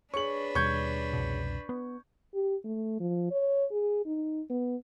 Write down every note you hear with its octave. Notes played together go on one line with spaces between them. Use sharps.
D4 G#4 B4 C#5 C#6 F#7
D#2 B2 G3 C#6 G6 G#6
C2 F2 B2
B3
G4
A3
F3
C#5
G#4
D#4
B3